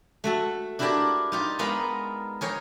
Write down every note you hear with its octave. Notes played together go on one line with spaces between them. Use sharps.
A3 F#4 A4
D4 E4 F#4 G4 A#4 D5
D#4 F4 G4
G#3 B3 A#4 F5
G#4 A#4 C#5 G5